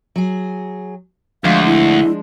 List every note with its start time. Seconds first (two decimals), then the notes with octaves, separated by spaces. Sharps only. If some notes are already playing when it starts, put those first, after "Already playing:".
0.16 F#3 G#4
1.44 D2 F3 G#3 D4 F5
1.66 E4